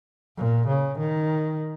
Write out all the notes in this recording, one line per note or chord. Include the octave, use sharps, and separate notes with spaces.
A#2
C#3
D#3